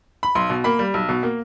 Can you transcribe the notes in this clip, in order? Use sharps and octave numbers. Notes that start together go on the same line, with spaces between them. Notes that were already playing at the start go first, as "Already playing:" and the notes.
B5
B1 C6
B2
A#3 B5
G3
B1
B2
A#3